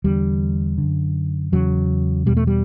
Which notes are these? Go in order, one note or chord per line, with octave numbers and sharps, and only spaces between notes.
E2 D3 G3
F#2 D3
E2 C#3 F#3
E2 B2 G3
A3
G3